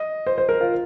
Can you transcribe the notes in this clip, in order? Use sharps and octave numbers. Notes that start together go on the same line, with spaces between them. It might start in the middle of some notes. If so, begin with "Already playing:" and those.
Already playing: D#5
C5
C5
A#4
F4